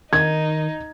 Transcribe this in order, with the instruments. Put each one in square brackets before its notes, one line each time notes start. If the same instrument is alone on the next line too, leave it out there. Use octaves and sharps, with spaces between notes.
[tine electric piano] D#3 [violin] D#4 [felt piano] G#6